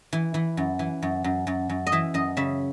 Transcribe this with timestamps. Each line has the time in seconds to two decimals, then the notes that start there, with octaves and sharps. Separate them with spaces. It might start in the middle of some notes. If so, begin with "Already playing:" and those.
0.13 E3
0.34 E3
0.57 F#2
0.79 E3
1.02 F#2
1.24 F#2
1.47 F#2
1.69 F#2
1.87 D#5
1.92 E3 E5
2.14 F#2 D#5
2.37 C#3 E5